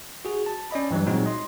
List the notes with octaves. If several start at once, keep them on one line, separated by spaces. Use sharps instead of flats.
F#4 G#4
A5
C#4 D5 D#5 B5
G2 E3 F#3 G3
A#2 F#3 G#3 C4 D#4 F#4
D#5 C6